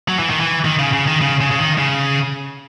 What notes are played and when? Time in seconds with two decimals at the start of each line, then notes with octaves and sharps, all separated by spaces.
0.08 F#3
0.19 E3
0.30 D#3
0.40 E3
0.65 D#3
0.79 C#3
0.93 C#3
1.07 D#3
1.22 C#3
1.41 C#3
1.51 C#3
1.59 D#3
1.78 C#3